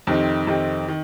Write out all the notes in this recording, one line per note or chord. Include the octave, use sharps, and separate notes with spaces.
F2 C3 D#3 C4 D#4
F2 C3 D#3 C4 D#4
D#3